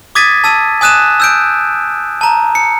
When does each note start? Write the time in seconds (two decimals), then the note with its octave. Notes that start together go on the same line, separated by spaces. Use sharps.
0.15 D6 D#6 G#6 A6 B6 D#7
0.44 A5 E6 D#7
0.81 G#5 D#6 F#6 D#7 E7
1.20 E6 G6 D7
2.21 A5 A#5
2.55 C#7